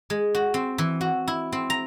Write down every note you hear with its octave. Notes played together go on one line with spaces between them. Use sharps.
G#3
F#4
C4
E3
F#4
E4
C4
A#5